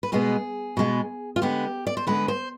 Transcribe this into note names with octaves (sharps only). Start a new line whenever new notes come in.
B4
B2 G#3 B3 G#4
B2 G#3 B3
F4
D3 G#3 B3 G4
D5
C5
D3 G#3 B3 B4
C5